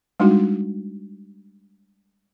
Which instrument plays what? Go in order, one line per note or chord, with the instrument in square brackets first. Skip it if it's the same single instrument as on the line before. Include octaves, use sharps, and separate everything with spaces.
[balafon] G3 G#3 D4 D#4 F#4